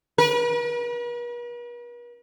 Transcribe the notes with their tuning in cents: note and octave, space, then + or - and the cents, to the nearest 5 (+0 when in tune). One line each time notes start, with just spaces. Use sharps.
B4 -45